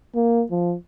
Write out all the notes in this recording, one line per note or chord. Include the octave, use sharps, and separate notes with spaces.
A#3
F3